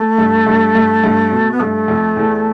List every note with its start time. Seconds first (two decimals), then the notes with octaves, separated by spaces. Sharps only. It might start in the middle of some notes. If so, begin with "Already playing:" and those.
Already playing: A3
0.18 G2
0.47 G2
0.75 G2
1.04 G2
1.32 B2
1.51 B3
1.60 G2 A3
1.88 F2
2.16 E2